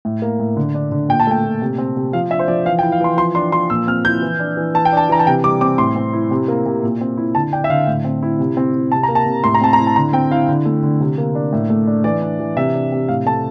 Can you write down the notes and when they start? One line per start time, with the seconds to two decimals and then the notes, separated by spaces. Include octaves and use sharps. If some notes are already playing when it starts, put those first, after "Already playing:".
0.05 A2
0.22 A#3
0.39 A2
0.57 D3
0.75 D4
0.92 D3
1.09 A#2 G5
1.20 A5
1.27 A3 G5
1.44 A#2
1.62 C3
1.78 C4
1.97 C3
2.13 F3 F5
2.30 D4 E5
2.39 C5
2.48 F3 D5
2.65 E3 F5
2.79 G5
2.83 E4
2.92 F5
3.01 E3 C6
3.17 F3 C6
3.35 D4 C6
3.52 F3 C6
3.70 A#2 E6
3.87 C4 F6
4.05 E4 G6
4.22 E3
4.40 D4
4.57 E3
4.74 E3 A5
4.85 G5
4.92 D4 A5
5.09 E3 A#5
5.19 A5
5.27 C3 G5
5.44 G3 D6
5.61 C4 D6
5.78 A2 C6
5.96 C4
6.13 E4
6.31 C3
6.48 A#3
6.66 C3
6.83 A#2
7.01 C4
7.17 E4
7.35 D3 A5
7.53 D4 G5
7.64 E5
7.69 D3 F5
7.87 A2
8.04 C4
8.23 E4
8.39 C3
8.57 C4
8.74 E4
8.92 C3 A5
9.03 A#5
9.09 A#3
9.15 A5
9.26 C3
9.44 A2 C6
9.54 A#5
9.61 C4 A5
9.73 A#5
9.78 E4
9.87 A5
9.96 D3 A#5
10.13 C4 G5
10.31 E4 F5
10.48 D3
10.65 A3
10.83 D3
11.00 C3
11.18 A#3
11.35 D4
11.53 A2
11.70 A3
11.87 D4
12.04 E3 D5
12.22 D4
12.40 E3
12.57 C3 E5
12.74 D4
12.92 C3
13.09 A2 F5
13.26 A3 A5